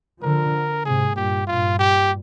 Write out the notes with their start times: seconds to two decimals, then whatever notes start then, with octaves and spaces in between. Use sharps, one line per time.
0.23 D3 F3 A#4
0.85 G#2 C3 G#4
1.16 G2 A#2 G4
1.47 G2 A#2 F4
1.79 G4